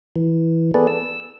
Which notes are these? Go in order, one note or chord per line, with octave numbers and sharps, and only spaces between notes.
E3
B3 G#4 A4 B4 D5
E6